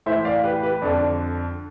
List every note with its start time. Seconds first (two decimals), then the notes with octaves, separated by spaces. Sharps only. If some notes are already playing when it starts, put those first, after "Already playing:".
0.06 A2 E3 C5 E5
0.25 D5 F5
0.44 G4 B4
0.62 G4 B4
0.82 F2 D3 D4